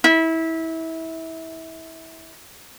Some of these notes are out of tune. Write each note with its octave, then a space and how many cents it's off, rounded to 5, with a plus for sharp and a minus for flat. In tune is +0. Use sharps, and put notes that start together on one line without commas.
E4 -25